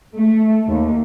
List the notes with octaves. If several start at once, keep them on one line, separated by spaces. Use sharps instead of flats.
A3
D#2